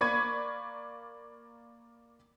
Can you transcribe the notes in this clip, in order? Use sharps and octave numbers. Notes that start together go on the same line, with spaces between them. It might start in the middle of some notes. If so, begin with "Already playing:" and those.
A#3 D5 B5 C#6 G#6 D#7